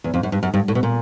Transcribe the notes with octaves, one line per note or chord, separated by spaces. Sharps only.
E2
F2
F#2
G2
F#2
G2
A2
B2
A#2